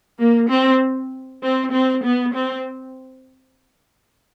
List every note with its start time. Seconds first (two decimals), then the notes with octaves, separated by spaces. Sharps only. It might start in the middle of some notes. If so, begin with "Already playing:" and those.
0.19 A#3
0.50 C4
1.42 C4
1.73 C4
2.04 B3
2.33 C4